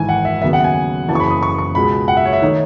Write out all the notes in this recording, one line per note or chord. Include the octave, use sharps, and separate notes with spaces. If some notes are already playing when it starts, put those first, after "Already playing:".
Already playing: G#1 G#2 E3 G#5
F#5
E5
D#2 C#3 F#3 B3 E5
F#5
G#5
F#1 F#2 C#3 E3 A5
C#6
B5
D#6
C#6
C#6
C#2 B2 G#3 B5
F#5
E5
C#5
E5
D#3 A3 D#4 C#5